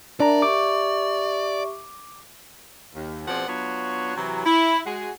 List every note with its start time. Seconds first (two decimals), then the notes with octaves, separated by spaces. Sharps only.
0.20 D4 A#4 D5 E5 A#5
0.42 G4 E5 C#6 D6
2.95 D#2
3.27 B2 F3 C4 G#4 D5 F#5
3.47 F#3 B3 D4 F4 F#4 C#5
4.16 C3 E3 F#3
4.45 E4
4.85 G#3 F#4 G#4